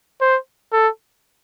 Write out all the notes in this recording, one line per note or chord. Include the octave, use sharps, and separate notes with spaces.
C5
A4